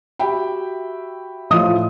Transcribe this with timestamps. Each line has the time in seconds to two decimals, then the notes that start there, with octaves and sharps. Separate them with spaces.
0.19 F#4 G4 E5 G5 B5
1.50 A2 F3 F4 C#5 D#5 D#6